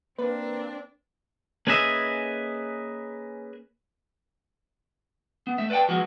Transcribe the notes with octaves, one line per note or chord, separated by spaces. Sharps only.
A#3 C4 D4 B4
A#3 C#4 G#4 B4 D#5 E5
B3
A3 E5
B4 D5 F#5 G5 A5
F3 F#3 G#3 B3 F#4